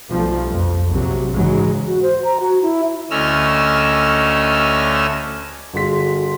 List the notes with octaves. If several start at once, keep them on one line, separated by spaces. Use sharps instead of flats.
B1 G2 F3 A3
F2
A#1 C3 F#3
G#2 C#3 E3 F#3 G#3
F#4
C5
A#5
F#4
E4
D2 A3 C#4 D#5 E6 F6
G1 F#4 G#4 C6 B6